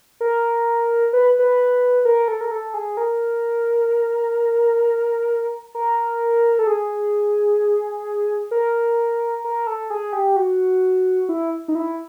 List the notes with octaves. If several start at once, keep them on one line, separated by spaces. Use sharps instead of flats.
A#4
B4
B4
A#4
A4
A#4
A4
G#4
A#4
A#4
A4
G#4
A#4
A#4
A4
G#4
G4
F#4
E4
D#4
E4